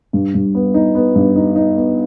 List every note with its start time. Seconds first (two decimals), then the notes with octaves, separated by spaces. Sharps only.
0.13 G2
0.34 G2
0.55 B3
0.74 D#4
0.95 B3
1.15 G2
1.36 D#4
1.56 D#4
1.77 B3